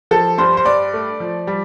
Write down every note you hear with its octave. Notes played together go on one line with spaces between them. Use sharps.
F3 A4
G2 C5
C5
G2 D5
A3
F3
G3